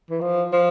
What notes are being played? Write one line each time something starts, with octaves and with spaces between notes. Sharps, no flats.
E3
F3
F3